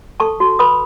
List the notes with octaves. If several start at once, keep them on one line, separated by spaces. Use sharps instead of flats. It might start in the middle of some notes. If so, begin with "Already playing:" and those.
A4 A5 C#6
F#4
B4 B5 D#6